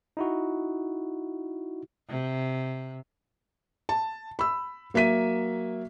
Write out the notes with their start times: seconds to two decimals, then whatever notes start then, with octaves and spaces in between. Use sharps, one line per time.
0.17 D#4 E4 F#4
2.09 C3
3.89 A5
4.39 B5 E6
4.94 F#3 A#3 E5 B6 D#7